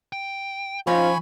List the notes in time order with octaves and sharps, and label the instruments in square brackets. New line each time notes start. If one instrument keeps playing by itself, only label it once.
[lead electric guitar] G5
[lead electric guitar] F3 [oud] C4 C#4 D#4 [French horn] F4 [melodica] G#5 B5 C#6